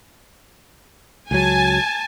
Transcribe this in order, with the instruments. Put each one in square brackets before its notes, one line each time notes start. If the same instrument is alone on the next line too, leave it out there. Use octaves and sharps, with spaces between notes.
[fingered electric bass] C#2 F#3 [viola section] G#5 A5